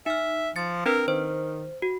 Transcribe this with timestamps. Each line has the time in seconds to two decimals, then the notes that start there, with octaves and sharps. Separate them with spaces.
0.06 D#4 E5 F6
0.56 F3 A6 C#7
0.86 C4 D4 A#4 B4
1.08 D#3 C5
1.82 F#4